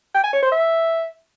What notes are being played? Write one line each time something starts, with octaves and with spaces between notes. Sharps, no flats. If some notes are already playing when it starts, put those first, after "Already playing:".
G5
G#5
C#5
C5
E5